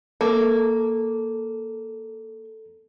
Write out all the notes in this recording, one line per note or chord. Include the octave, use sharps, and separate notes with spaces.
A#3 A4